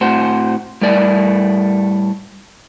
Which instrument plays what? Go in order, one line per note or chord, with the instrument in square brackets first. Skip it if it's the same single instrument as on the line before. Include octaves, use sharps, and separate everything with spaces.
[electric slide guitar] A2 C4 F#4 C5
A2 G3 A3 A#4 D5